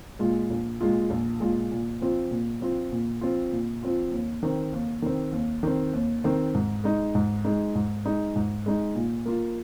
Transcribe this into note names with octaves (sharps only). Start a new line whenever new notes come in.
A#2 G#3 F4
A#1
A#2 G#3 F4
A#1
A#2 G#3 F4
A#2
F3 C4 F4
A#2
F3 C4 F4
A#2
F3 C4 F4
A#2
F3 C4 F4
D#2
D#3 C4
D#2
D#3 C4
D#2
D#3 C4
D#2
D#3 C4
G#2
G#3 D#4
G#2
G#3 D#4
G#2
G#3 D#4
G#2
G#3 D#4
A#2
A#3 F4